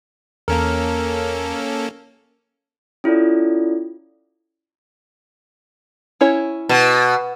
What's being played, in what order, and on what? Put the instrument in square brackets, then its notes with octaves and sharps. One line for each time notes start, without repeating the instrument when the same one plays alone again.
[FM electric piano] E2 [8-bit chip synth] A#3 C#4 A4 [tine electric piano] A#4
[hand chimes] C#4 E4 F4 A4 D5
[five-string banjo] C#4 E4 C#5
[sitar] B2